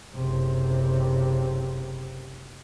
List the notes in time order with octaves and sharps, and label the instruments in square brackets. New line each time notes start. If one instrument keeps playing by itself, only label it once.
[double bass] F#1 C3